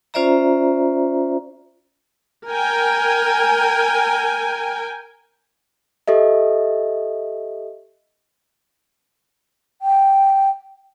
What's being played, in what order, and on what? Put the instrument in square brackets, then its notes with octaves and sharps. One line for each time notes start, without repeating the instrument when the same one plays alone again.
[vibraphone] C#4 F4 C5 D5 E5 A#5
[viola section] A#4 G5 G#5
[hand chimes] G4 A4 D#5 E5
[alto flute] G5